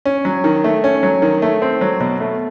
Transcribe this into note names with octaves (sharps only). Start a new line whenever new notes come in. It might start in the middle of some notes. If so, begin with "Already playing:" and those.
C#4
F#3
D#3
A3
C#4
F#3
D#3
A3
C4
F#3
B2
A3